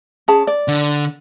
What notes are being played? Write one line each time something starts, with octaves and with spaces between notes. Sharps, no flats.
C#4 G#4 A5
D5
D3